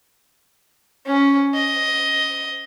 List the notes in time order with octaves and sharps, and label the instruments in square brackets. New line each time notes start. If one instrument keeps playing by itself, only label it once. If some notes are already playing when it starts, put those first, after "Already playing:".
[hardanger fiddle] C#4
D#5